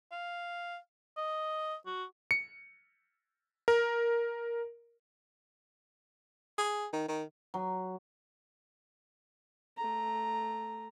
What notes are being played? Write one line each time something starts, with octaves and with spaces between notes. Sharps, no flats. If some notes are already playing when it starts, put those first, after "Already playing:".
F5
D#5
F#4
C#7
A#4
G#4
D#3
D#3
F#3
A3 A#5